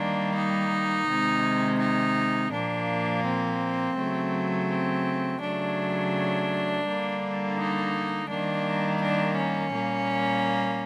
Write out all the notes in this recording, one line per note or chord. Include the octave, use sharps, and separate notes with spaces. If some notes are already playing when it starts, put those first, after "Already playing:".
Already playing: D#3 G3 A#3 D4
D#4
C3 D#3 G#3
D#4
A#2 F3 A#3 D4
C4
C#3 F#3 A3
C4
C#3 F#3 A3 D4
D3 G3 A#3
D#4
D#3 G3 A#3 D4
D4
C#4
A#2 G3 A#3